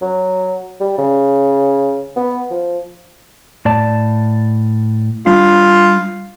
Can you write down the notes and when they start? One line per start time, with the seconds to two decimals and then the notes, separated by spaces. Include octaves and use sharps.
0.02 F#3
0.81 G3
0.98 C#3
2.16 B3
2.51 F3
3.65 A2 D5 A5
5.26 G3 D4 F4 F5